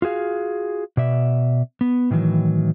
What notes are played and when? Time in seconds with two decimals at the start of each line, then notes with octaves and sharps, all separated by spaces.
0.02 F4 F#4 G#4 F5
0.97 B2 D5 E5
1.81 B3
2.11 A2 D#3 E3 F#3